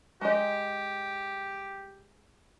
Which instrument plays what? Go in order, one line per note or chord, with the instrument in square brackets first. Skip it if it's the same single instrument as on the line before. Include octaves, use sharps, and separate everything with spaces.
[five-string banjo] G#3 D#5 [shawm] G4